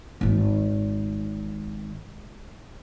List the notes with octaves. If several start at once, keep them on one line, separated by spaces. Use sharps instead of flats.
G#1 D#3